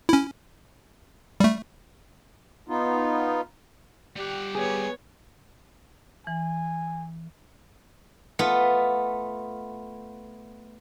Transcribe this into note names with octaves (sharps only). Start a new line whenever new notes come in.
C#4 E4
G3 A3
B3 D#4 F4
G3 G4 F#5
B3 G#4 C#5
E3 G#5
A3 B3 F4